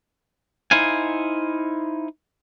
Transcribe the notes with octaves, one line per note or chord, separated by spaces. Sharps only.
D#4 E4 C5 F5 G#5